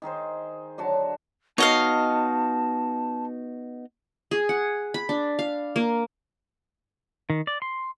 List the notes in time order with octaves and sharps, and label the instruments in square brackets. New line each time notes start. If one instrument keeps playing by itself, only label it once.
[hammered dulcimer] D#3 D#4 G#4 C5
D3 F#3 F#4 A5
[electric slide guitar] B3 D#4 F#4 [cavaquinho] C#5 D#5 F5 [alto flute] A5
[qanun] G#4
F#5
B5
D4
F5
A#3
[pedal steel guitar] D#3
D5
C6